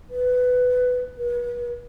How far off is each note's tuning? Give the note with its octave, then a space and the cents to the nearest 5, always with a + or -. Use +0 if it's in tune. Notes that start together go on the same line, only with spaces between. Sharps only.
B4 +15
B4 -35